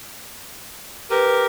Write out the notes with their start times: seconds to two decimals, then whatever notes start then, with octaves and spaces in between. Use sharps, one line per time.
1.11 G4 A#4 B4